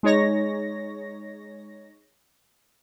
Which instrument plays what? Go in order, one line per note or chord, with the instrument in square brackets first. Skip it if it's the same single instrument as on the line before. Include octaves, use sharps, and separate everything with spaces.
[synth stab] G#3 D#4 C#5 A#6